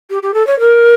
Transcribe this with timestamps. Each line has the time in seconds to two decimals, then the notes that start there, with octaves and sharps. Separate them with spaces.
0.10 G4
0.23 G4
0.34 A4
0.47 C#5
0.60 A#4